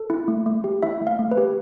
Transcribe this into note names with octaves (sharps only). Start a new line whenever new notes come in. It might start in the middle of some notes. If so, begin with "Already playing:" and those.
Already playing: A4
E4
A3
A3
G4
E4 E5
A3
F5
A3
B4
G4